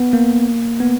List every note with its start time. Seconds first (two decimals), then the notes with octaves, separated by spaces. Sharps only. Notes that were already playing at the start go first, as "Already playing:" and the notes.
Already playing: B3
0.13 A#3
0.80 B3